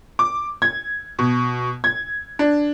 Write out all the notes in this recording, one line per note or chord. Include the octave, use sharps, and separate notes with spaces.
D6
G#6
B2
G#6
D4